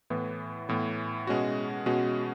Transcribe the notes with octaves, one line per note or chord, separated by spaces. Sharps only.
A2 E3 B3
A2 E3 B3
B2 G#3 C#4 F#4
B2 G#3 C#4 F#4